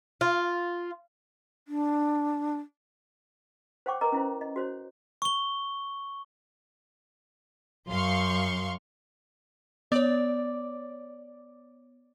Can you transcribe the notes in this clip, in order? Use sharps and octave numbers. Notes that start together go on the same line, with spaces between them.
F4
D4
C5 C#5 F#5 G5 C#6 D6
A#4 B4 D#5 A#5 D6
C#4 E4 C5
D#5
F#4 C5 C#5
C#6 G7
F#2 F5 C6 C#6
B3 C#5 D5